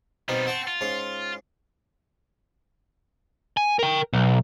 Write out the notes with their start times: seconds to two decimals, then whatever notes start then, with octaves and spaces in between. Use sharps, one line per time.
0.29 B2 G3 C4 D#4 F4
0.47 C4 F#5 A5 C#6
0.68 F4
0.81 G#2 C#4 C6
3.57 G#5
3.79 A#4 G5
4.13 B1